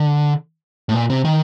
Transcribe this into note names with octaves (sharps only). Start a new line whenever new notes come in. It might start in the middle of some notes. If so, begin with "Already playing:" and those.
Already playing: D3
A2
A#2
C3
D#3